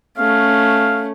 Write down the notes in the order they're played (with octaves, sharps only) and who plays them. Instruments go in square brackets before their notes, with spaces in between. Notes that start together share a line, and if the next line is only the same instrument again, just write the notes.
[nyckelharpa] A3 C#4 [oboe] F5